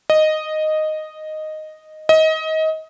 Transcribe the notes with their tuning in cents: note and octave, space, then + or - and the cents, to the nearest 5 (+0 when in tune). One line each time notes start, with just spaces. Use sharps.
D#5 -5
D#5 +25